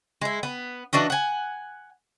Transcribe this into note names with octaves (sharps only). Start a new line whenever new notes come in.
G#3 E4
B3
E3 D4 F#4 D#5
F#5 G#5